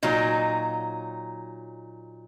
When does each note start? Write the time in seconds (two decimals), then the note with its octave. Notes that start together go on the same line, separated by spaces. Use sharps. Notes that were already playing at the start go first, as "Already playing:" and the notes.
0.03 A#2 F#3 D#4